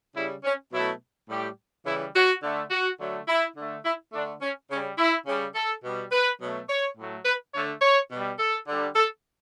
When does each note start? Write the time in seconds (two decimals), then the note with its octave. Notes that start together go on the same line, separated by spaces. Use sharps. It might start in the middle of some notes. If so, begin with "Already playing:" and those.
0.15 C#3 G3 E4
0.44 C#4
0.72 B2 F#3 A3 E4
1.29 A2 G3 G4
1.86 C#3 E3 G3 E4
2.15 F#4
2.43 D3 A3
2.71 F#4
3.00 D3 F#3 A3
3.28 E4
3.57 D3 A3
3.84 E4
4.13 D3 A3 D4
4.42 C#4
4.70 C#3 G3 C#4
4.98 E4
5.27 C#3 G3
5.55 A4
5.84 B2 G3
6.12 B4
6.40 B2 F#3 A3
6.70 C#5
6.97 A2 F#3 A3
7.26 B4
7.53 D3 A3 C#5
7.82 C#5
8.11 B2 G3
8.39 A4
8.68 D3 G3
8.96 A4